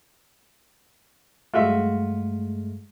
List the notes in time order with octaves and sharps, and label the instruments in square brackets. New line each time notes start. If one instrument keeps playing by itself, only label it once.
[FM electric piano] G2 G#3 A3 [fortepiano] F4 F#4 E5